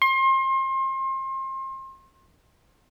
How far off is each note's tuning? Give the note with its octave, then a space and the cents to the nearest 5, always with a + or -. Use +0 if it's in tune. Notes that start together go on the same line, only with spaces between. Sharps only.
C6 +35